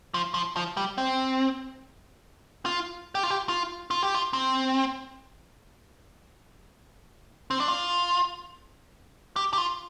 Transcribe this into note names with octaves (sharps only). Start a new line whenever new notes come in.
F3
F3
F3
G3
C4
F4
G4
F4
G4
F4
F4
G4
F4
C4
C4
D4
F4
G4
G4
F4